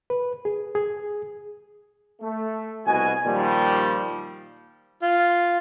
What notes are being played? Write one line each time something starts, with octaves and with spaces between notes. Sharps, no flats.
B4
G#4
G#4
A3
C2 B2 F#4 D#5 G#5
A#2 D#3 F3 G3
F4